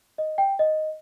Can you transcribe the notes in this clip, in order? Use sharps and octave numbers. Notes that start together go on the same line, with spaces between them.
D#5
G5
D#5